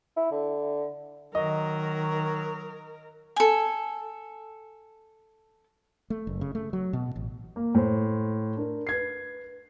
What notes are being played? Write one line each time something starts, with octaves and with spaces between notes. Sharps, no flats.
E4
D3
D#3 F#3 A#4 D#5
A4 G#5
A3
F#1
C#3
A3
F#3
B2
A1
A#3
A2 C5
D4 A#4
B4 G#6 C7